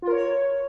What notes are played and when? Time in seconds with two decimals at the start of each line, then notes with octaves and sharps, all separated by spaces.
0.02 F4
0.07 A#4
0.12 C#5